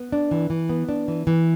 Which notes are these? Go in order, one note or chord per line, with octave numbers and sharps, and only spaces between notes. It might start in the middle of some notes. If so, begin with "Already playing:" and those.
Already playing: B3
D4
E3
E3
B3
D4
E3
E3